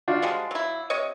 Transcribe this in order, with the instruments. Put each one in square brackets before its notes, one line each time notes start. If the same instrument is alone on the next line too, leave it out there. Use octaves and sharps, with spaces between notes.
[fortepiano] D4 F4 F#4
[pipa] F3 G3 G#3
F#3 E4
C3 C#5 D#5